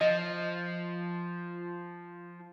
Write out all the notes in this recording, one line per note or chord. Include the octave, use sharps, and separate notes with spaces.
F3 D#5